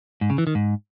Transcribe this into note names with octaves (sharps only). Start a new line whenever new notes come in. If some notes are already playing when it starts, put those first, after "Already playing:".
G#2
C#3
E3
D#3
G#2